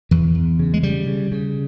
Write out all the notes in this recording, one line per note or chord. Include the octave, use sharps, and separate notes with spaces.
E2 E3
E2
C#3
G#3
C#3 G3
C#3
C#3